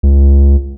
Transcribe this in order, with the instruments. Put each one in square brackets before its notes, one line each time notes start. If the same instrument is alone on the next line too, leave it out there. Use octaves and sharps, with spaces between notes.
[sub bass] C#2